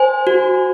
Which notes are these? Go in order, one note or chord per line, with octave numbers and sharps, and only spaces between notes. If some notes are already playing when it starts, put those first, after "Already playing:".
Already playing: C5 G#5
F#4